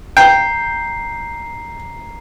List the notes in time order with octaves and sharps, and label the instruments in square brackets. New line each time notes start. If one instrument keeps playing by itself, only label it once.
[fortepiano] G5 [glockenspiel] A#5 C7